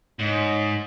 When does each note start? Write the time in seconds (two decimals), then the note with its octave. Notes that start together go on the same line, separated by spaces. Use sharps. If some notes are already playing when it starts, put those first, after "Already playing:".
0.19 G#2 C#5 D#5